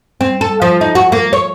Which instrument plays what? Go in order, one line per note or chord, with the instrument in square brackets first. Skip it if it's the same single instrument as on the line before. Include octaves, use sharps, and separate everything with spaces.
[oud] C4
A4
F3
D#4
F#4
A#3
C#5